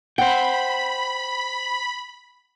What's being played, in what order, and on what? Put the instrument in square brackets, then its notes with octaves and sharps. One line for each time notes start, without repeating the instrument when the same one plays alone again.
[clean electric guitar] C5 G5 [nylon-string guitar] F#5 [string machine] B5